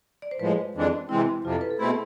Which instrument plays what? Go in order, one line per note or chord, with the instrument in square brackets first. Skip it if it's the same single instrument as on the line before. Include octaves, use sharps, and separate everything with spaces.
[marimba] D5
C5
[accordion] A2 F3 G#3 [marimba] B4
[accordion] F2 E3 G#3 D4
[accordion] C3 E3 G#3 C4 [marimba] E4
[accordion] F2 C3 F3 [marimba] F4
[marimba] A4
B4
A4
[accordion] B2 A3 C4 E4 [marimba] G#4